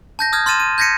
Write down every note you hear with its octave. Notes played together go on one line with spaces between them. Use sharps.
A5 G6 A#6
D#6 F6 G6 G#6
C6 F6 A6 D#7 E7
D#7
G6 G#6 A#6 B6 C#7 D#7